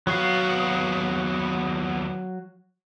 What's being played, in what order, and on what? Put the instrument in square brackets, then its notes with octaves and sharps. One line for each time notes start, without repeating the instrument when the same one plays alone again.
[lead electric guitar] D#2 B3 [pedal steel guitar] F#3 F#4 F5